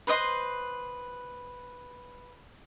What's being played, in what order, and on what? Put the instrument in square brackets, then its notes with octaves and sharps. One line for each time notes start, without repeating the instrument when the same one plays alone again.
[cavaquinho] B4 C5 D#5 C6